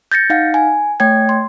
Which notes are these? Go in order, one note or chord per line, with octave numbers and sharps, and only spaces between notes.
G6 A6 A#6 C#7
D#4 F5 F#5
G#5
A3 C#5 G5 G#6
C6